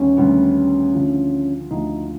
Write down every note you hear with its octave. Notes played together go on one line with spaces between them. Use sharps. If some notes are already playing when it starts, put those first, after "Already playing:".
Already playing: D2 D#3 G3 B3 C#4
D2 C3 D#3 G3 B3
D2 D3 F3
D2 D3 F3 D#4